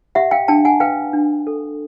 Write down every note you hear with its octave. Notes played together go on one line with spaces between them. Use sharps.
G4 E5 F#5
F5 G5
D4 G5 A5
F#5 G#5
B4 F5 G5
D4
A4